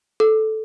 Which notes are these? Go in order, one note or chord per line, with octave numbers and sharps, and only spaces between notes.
A4